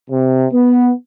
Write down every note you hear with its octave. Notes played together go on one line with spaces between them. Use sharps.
C3
B3